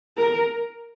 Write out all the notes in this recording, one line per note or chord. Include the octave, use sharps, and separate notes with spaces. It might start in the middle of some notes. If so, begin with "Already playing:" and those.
A#4